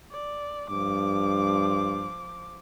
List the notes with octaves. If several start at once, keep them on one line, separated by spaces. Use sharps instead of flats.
D5
G2 F3 D6